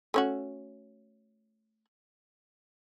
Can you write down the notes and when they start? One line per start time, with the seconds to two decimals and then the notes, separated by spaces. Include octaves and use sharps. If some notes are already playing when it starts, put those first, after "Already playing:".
0.14 A3 C#4 F#4